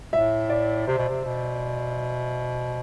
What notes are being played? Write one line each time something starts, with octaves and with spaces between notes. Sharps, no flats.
A2 E5
D5
C3 C5
B2
C3
B2